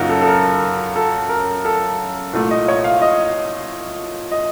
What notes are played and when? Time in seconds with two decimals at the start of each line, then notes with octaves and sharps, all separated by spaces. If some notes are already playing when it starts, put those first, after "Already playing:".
Already playing: F#2 C#3 F#3 A#3 D#4 F4 F#4
0.09 A4
0.21 A4
0.27 A#4
0.96 A4
1.29 A#4
1.65 A4
2.33 C2 A#2 A3
2.51 D#5
2.68 C#5
2.84 F5
3.02 D#5
4.31 D#5